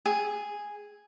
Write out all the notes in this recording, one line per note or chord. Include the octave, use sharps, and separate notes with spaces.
G#4